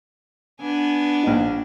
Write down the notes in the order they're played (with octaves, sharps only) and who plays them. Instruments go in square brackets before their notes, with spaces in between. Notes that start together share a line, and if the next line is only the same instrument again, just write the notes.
[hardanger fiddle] B3 G#5 [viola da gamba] D4
[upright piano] A#1 D#4